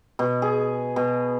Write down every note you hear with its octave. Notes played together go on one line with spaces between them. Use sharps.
B2
G#4
B2